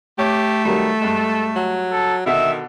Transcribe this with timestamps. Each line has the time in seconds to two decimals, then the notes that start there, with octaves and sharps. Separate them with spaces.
0.19 A3 G4 C#5 D6
0.65 D#3 F#3 G3 A4
1.01 G2 G#3
1.56 F#3
1.92 A4
2.26 B2 D3 D#3 E5